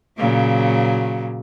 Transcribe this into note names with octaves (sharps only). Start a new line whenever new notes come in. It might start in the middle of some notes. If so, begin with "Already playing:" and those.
A#2 C#3 F#3